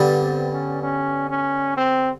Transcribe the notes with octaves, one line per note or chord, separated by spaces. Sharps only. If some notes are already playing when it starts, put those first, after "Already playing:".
Already playing: G2 D3 G3 B3
C4
C#4
C#4
C#4
C4